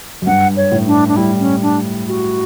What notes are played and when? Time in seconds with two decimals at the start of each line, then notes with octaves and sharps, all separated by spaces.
0.22 F#2
0.27 G2 F#5
0.57 C#5
0.72 A2
0.87 D4
1.08 D4
1.16 G3 E4
1.40 C#4
1.62 D4
2.08 F#4